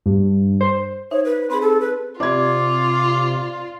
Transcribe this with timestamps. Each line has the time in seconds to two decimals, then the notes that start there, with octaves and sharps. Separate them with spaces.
0.06 G2
0.61 C5
1.11 D#4 C5 C#5 E5
1.25 B4
1.50 C4 G#4 B5
1.61 A4
1.80 B4
2.20 C3 F4 D5 D6 G#6